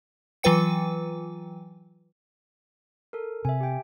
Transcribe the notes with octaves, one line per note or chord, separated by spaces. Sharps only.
E3 F#3 F4 B4 G5 C#7
A4 A#4
C3 E5 G#5
G4 G5